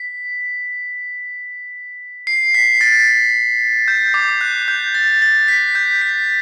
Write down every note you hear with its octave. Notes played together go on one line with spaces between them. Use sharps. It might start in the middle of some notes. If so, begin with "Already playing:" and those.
Already playing: B6
C7
B6
A6
G6
D6
F#6
G6
A6
A6
B6
G6
B6